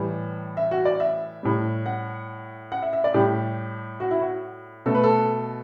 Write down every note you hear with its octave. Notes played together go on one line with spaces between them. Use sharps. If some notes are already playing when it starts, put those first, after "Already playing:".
Already playing: A2 E3 G3
E5
F#4
D5
E5
A2 G3
F#5
F#5
E5
E5
D5
A2 G3 G4
F#4
E4
F#4
B2 A3 A4
B4
A4